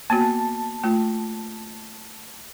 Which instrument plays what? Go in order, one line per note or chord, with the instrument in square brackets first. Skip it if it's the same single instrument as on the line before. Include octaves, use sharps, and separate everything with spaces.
[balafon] A#3 B3 F#4 [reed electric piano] A5
[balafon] A3 F4